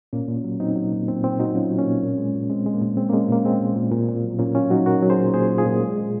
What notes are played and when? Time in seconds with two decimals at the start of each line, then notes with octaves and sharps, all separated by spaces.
0.13 A#2 A#3 C#4
0.29 A#2
0.44 F#3
0.60 F#3 C4 D#4
0.76 F#3
0.92 A#2
1.08 A#2 C4
1.23 A#2 C4
1.39 A#2 D#4 F#4
1.55 F#3 C#4 F4
1.70 F#3
1.79 A#3 C#4
1.87 A#2
2.03 A#2
2.18 G#3
2.35 A#2
2.50 G#3 C4
2.66 G#3
2.73 A#3
2.82 A#2
2.97 G#3 C4
3.09 G#3 A#3 C#4
3.29 A#2 A#3
3.45 G#3 C4
3.61 A#2
3.76 A#2
3.91 A#2
4.08 A#2
4.24 F#3
4.39 A#2 A#3 C#4
4.55 F#3 C#4 F4
4.70 F#3 D#4 F#4
4.86 A#2 F#4 A#4
5.02 F#3
5.10 G#4 C5
5.18 A#2
5.34 A#2 G#4 C5
5.50 A#2
5.58 F4 G#4
5.65 A#2
5.81 G#3
5.97 G#3